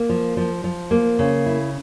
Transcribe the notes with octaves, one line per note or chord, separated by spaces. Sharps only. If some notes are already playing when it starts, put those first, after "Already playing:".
Already playing: A#3
F3
F3
F3
A#3
C#3
E4